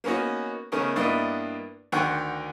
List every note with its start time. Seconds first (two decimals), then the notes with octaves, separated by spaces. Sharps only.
0.04 A#3 B3 C#4 D#4 F#4
0.72 C#3 A3 B3 C#4 D#4 A#4
0.96 G2 A#3 B3 D4 E4 D#5
1.92 D2 D3 D#3 F#5 G5 C#6